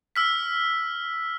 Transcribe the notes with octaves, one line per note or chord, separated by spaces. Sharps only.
E6 F6 B6